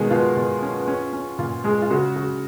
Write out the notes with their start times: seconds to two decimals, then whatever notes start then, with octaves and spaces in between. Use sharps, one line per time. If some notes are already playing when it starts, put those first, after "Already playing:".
Already playing: B2 D#3 G#3 G#4
0.10 B2 F4
0.37 B2
0.62 C#4
0.88 C#4
1.13 C#4
1.39 A#2 F4
1.64 G#3 G#4
1.82 F4
1.90 C#3 F#4
2.16 C#3 F#4